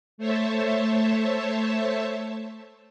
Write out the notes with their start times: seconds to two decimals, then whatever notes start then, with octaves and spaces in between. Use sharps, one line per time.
0.18 A3 C5 C#5 E5 A5